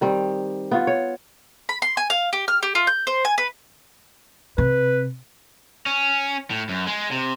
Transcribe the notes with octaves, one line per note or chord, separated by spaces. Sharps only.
D#3 G3 C4
B3 F4 C#5
C#5
B5
C6
G#5
F5
G4
F6
G4
F4
G6
C5
G#5
B4
C3 B4
C#4
A2
F#2
G#3
C3